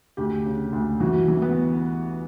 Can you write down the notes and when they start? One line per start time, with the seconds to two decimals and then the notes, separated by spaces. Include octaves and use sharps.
0.17 D2 G4
0.45 C#3
0.73 D2
1.00 E3 F#4
1.28 E3
1.42 B3